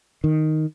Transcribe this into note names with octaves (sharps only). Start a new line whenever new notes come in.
D#3